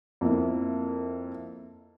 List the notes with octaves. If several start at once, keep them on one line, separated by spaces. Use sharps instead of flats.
F2 A#3 E4